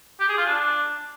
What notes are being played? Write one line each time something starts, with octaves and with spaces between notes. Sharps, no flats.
G4
G#4
F4
D4